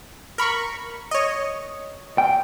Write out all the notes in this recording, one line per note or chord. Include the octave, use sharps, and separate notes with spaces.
A#4 B5 C#6
C#5 D#5
G5